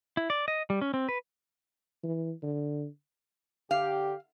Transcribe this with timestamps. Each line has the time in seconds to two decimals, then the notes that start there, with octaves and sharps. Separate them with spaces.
0.17 E4
0.30 D5
0.48 D#5
0.70 G3
0.81 C#4
0.94 C4
1.09 B4
2.04 E3
2.43 D3
3.71 D3 G4 F5